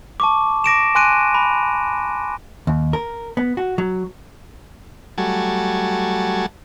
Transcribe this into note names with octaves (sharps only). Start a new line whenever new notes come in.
A5 C#6 D6
D6 A#6 D7 E7
G#5 C6 F#6 D7 D#7
B5
D#2
A#4
B3
F#4
F#3
F#3 G3 A3 F#4 G#5 A5